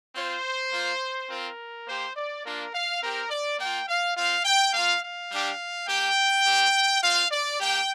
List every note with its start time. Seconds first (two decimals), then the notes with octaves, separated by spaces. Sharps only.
0.15 C4 F4 C5
0.73 A#3 F4
1.30 C4 F4 A#4
1.87 A#3 G4 C5
2.16 D5
2.44 A#3 D4 F4 A#4
2.74 F5
3.02 C4 G4 A#4
3.30 D5
3.59 A#3 F4 G5
3.88 F5
4.16 C4 F4 F5
4.45 G5
4.73 A#3 F4 F5
5.03 F5
5.31 G3 D4 G4
5.88 A#3 G4 G5
6.45 C4 G4
7.03 C4 F4 F5
7.31 D5
7.60 A#3 G4 G5